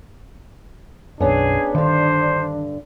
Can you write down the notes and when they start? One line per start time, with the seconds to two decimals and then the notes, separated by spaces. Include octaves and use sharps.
1.20 B1 F#2 B3 C#4 D4 G#4
1.75 G2 D3 D#3 C5